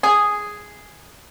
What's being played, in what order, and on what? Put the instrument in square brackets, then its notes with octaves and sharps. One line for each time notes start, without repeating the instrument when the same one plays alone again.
[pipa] G#4